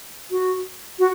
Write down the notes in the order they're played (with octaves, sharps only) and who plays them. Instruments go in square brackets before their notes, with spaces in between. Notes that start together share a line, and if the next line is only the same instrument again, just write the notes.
[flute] F#4
F#4